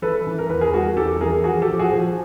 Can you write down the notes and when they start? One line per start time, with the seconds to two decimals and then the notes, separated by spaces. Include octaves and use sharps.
0.02 E3 A4 B4
0.27 E3
0.39 A#4
0.49 E2 B4
0.61 G#4 A#4
0.74 G3 F#4 G#4
0.96 E2 G4 A4
1.21 E3 G#4 A#4
1.44 F3 F#4 G#4
1.62 G4 A4
1.68 F3
1.79 F#4 G#4
1.91 F3